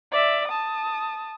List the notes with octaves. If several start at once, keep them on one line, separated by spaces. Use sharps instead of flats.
D5 E5
A5 D#6